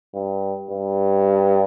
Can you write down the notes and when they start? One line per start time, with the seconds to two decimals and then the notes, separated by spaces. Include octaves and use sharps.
0.14 G2
0.71 G2